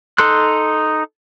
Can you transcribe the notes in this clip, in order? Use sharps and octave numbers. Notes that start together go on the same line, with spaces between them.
D#4 A4 C6 F#6